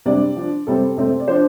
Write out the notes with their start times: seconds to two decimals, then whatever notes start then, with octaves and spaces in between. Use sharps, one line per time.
0.05 C3 G3 D4 D5
0.36 F3 D4
0.67 C3 G3 C4 A4
0.97 C3 A3 C4
1.20 D5
1.28 F3 D4 C5